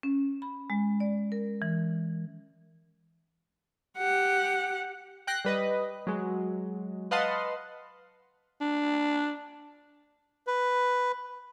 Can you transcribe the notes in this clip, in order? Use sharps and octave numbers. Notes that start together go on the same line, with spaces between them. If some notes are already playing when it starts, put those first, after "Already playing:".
C#4
B5
G#3
D5
A#4
E3
G4 F#5
G5 F#6 A#6 C7
G3 B4 D#5
F#3 G#3
B4 D#5 F5 F#5 A5 C6
D4
B4